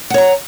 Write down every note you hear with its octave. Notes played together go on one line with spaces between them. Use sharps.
C#5 F#5 A#5